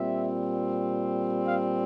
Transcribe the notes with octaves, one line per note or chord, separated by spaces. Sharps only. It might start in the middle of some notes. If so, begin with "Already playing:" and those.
Already playing: A#2 G3 C4 E5
F5